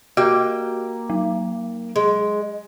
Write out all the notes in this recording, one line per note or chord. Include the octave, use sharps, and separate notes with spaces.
A#3 F#4 G4 G5
F#3
G#3